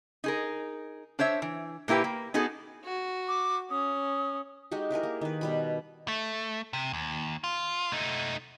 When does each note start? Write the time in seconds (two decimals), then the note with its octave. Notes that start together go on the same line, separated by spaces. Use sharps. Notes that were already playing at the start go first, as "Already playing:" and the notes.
0.24 D#4 G#4 A#4
1.19 D4 C5 C#5 E5
1.42 E3
1.88 A#2 A#3 E4 G4 B4
2.04 A#3
2.34 B3 D#4 F#4 G#4 A4
2.84 F#4
3.28 D6
3.71 C#4 D#6
4.72 G#3 D#4 F#4 G4
4.90 E4 G4 G#4 A#4
5.03 A#3
5.21 D#3 B4
5.41 B2 G3 B5
6.08 A3
6.73 C3
6.93 D#2
7.44 F4
7.92 A3 D#4